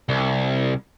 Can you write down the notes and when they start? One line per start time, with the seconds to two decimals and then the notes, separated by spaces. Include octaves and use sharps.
0.09 C2